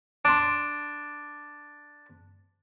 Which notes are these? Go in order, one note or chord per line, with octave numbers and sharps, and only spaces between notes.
D4 C6